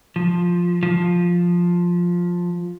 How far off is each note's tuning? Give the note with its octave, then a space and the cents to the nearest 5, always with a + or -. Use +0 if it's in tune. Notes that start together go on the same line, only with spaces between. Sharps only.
F3 +5
F3 +5